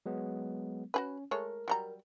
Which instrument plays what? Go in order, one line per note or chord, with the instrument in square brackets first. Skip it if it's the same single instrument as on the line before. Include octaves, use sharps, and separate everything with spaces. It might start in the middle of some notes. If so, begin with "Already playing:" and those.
[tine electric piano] F#3 G#3 B3
[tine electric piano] C#4 [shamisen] F#4 G#4 B4
[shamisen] G#3 A3 C#5 [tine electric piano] A#4
[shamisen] F#3 G3 A#5